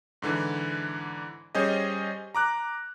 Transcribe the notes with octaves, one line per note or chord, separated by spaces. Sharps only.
G#2 D3 E3
G3 C#4 G#4 C5 D#5
A#5 D6 F#6